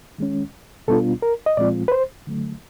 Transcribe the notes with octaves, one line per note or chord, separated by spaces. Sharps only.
D#3 G#3 C#4
B2 G3 B3 D4 F4 A4
A#4
D#5
A#2 F3 G#3 C4 F4 D5
B4
C5
D3 F#3 A3